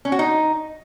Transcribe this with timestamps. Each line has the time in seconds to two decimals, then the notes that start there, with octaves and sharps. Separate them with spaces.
0.05 C#4
0.12 F#4
0.19 D#4